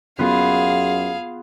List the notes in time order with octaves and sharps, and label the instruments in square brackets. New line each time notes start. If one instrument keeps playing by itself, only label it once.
[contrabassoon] F#2 [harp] B3 F4 [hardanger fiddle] G#4 F5